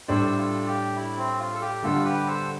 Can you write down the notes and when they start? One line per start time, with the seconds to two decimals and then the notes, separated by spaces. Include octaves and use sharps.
0.08 A2 G3 D4 A4 C5
0.38 F4 A4
0.67 G4
0.96 E4
1.17 C4
1.40 F4
1.54 A4
1.61 G4
1.83 G1 G2 D3 G3 F4 A4
2.04 G4 B4
2.26 A4 C5